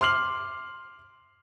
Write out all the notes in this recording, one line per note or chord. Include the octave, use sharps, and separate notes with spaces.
C6 D6 F6 C7 F#7